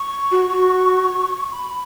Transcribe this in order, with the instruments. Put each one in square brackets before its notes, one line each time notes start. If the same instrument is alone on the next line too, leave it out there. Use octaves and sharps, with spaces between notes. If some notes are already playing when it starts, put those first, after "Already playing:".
Already playing: [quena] C#6
[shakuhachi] F#4
F#4
[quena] B5